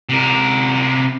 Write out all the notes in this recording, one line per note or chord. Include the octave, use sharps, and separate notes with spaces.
C3 A#4